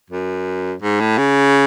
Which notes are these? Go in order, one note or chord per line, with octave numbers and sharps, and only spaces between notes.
F#2
G#2
A2
C#3